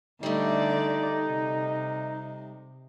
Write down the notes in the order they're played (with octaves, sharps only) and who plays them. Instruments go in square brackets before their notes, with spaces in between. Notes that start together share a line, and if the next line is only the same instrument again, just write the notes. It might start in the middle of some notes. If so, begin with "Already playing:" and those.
[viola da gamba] D3 D5 [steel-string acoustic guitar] G3 A3 [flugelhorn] D#4
[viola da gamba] C3